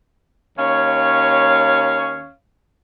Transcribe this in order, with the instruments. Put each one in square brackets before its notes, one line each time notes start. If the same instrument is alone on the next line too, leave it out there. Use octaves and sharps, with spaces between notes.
[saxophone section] D#2 C#4 C#5 F5